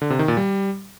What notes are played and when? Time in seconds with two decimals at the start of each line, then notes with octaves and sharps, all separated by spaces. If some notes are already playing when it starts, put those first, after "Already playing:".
0.02 D3
0.10 C3
0.19 D#3
0.28 A#2
0.37 G3